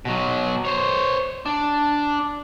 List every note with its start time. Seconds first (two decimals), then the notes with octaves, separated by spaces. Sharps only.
0.05 B2 F#3
0.65 C5 C#5
1.46 D4